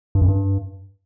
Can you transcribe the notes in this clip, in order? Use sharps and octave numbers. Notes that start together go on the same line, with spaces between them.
G2
F#2
G2